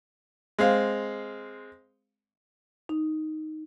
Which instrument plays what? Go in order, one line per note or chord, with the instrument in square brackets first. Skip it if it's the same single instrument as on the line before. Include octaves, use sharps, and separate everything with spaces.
[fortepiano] G#3 C4 F5
[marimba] D#4